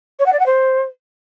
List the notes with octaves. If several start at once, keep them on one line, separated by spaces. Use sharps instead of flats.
C#5
F#5
D5
F#5
C5